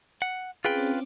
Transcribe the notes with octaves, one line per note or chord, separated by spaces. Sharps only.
F#5
C4 C#4 F4 G#4 B4 G5 D6